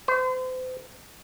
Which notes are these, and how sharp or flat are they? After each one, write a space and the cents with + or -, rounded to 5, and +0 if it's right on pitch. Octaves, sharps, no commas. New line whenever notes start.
C5 -35